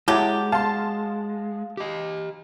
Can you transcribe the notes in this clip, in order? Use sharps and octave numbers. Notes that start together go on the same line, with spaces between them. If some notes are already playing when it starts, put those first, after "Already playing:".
F#3 G#3 E4 G4 A5 D6
F5 A5 C6
G4 D#5